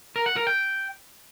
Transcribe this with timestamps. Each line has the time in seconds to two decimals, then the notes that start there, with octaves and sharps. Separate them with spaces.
0.16 A#4
0.26 F#5
0.36 A#4
0.47 G5